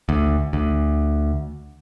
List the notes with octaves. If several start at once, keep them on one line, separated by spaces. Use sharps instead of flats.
D2
D2